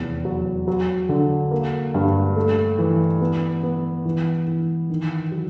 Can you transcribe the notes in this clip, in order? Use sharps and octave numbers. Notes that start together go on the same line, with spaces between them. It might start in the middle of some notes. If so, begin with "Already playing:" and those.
Already playing: F1 E2
F#3
F#3
D3
A#3
G2
A3
E3
B3
B3
E3
E3
D#3
F#3